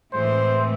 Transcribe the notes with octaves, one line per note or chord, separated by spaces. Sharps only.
A2 E3 G#3 C4 C5